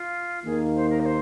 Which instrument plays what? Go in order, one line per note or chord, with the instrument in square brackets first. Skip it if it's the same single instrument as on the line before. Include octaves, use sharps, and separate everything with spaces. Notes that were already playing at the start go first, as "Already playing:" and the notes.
Already playing: [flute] F4
[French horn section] D#2 D#3 A#3 [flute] G#4
[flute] C5
A#4
D#5
C5